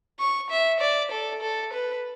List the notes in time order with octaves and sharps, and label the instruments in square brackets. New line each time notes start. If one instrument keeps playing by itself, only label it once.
[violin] C#6
E5
D5
A4
A4
B4